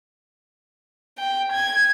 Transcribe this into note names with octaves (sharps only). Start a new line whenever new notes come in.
G5
G#6